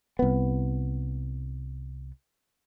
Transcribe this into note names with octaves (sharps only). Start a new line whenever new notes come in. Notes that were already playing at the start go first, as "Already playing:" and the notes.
C2 B3